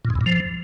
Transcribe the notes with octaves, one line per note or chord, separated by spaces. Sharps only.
A#2
G#2
E2
A#2
F3